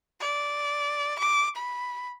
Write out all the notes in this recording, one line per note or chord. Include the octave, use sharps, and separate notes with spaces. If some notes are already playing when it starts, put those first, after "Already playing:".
D5
D6
B5